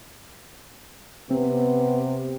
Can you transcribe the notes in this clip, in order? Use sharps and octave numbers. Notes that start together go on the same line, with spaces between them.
C3 B3 C4